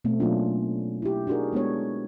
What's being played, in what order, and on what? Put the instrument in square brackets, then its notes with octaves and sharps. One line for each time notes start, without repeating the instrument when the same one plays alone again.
[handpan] B2 A3 C4
B2 F#3 A#3 C#4 D4 F4
E4 G4
D4 D#4 F#4 G#4 A#4
G#3 B3 D4 C#5